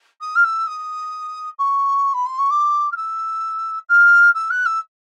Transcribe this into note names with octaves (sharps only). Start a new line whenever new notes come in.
D#6
F6
E6
D#6
C#6
B5
C6
C#6
D6
F6
E6
F6
E6
F#6
E6